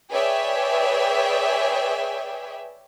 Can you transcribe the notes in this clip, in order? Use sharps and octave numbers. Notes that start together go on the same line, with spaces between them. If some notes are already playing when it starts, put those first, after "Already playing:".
G#4 B4 C#5 D5 E5 G5